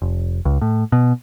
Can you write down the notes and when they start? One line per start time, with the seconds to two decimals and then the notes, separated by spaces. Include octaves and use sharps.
0.02 F1
0.45 C#2
0.62 A2
0.92 B2